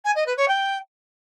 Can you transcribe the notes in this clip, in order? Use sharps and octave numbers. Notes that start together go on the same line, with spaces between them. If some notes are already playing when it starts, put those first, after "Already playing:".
G#5
D#5
B4
C#5
G5